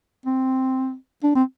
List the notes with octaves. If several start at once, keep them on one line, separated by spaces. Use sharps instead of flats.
C4
D4
C4